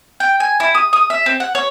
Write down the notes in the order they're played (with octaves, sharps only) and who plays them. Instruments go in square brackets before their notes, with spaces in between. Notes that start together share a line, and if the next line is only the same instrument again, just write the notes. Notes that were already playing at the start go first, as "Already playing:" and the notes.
[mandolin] G5
G#5
E4
D#6
D#6
E5
C4
F#5
C#5